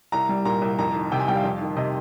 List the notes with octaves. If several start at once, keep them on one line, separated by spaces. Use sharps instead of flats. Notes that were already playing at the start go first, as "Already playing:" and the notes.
C2 A#5
G3
A#2 A#5
C2
F2 A#5
D#3
C3 G5
G#5
G3 G5
F5
F2
D#3
C3 D#5